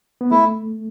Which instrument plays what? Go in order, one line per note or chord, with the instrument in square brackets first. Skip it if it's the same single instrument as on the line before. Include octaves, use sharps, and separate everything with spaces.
[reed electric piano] B3
[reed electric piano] A3 [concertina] E4